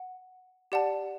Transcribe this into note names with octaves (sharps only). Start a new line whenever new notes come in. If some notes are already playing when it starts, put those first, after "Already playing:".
Already playing: F#5
G4 D5 F#5 A5